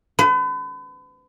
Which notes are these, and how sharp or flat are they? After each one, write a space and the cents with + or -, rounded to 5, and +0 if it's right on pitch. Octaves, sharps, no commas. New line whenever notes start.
B4 +40